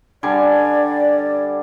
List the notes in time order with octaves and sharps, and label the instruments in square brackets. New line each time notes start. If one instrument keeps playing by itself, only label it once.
[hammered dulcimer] D3 G3 G#5 [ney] D5